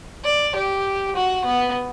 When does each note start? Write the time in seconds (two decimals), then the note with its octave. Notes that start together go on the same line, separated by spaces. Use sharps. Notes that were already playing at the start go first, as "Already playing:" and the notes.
0.24 D5
0.55 G4
1.16 F#4
1.45 B3